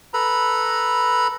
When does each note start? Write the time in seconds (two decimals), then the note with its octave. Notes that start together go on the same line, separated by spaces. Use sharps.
0.14 A4 B4 A#5 B5